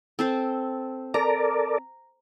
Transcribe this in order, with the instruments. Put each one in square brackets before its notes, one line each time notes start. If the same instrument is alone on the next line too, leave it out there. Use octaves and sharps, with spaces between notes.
[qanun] C4 A4 C5
[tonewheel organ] A4 A#4 D5 [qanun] A#5